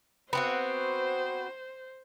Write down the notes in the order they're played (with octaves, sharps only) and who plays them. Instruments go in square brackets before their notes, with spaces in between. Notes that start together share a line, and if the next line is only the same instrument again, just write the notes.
[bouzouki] B3 C4 F#4 [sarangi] C5